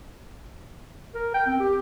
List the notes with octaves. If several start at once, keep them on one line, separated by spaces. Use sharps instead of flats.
A#4
G5
C4
G4